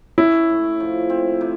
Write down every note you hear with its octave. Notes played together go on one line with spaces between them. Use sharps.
C#4 E4
A2
F3
C4
C3